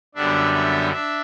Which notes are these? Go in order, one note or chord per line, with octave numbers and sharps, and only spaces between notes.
F#2 D3 G3 B3 D4 E5
E5
D4 E5